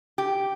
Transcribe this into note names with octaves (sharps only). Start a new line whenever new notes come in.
G4